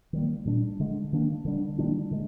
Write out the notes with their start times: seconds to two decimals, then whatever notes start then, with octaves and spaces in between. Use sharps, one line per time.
0.13 D#3 G3 A#3
0.45 A#2 G3 D4
0.80 D3 G#3 D4
1.13 D#3 A#3 D4
1.45 D3 G3 D4
1.78 D#3 G3 A#3 D4
2.11 D3 G#3